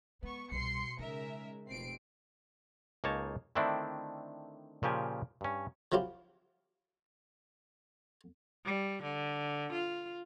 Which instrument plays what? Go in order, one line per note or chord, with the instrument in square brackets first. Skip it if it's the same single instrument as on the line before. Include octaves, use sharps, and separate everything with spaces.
[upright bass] G#3 [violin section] B3 C#6
[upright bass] C2 G3 [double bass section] B2 [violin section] C6 C7 C#7
[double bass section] C#3 G#3 [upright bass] D#4 [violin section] A#4 E5
[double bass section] F1 B2 [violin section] C4 C7 D7
[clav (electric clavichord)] C#2 A#3 D#4 C#5 A5
D3 D#3 A3 C4 D4 E4
A#2 C#3 F3 G4 G#5
G2 C#4
[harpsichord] F3 F#3 E4 F4 G4
[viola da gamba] G3
D3
F4